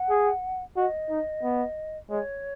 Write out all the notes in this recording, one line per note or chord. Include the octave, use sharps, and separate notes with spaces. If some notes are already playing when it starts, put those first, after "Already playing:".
Already playing: F#5
G#4
F#4 D#5
D#4
B3
G#3 C#5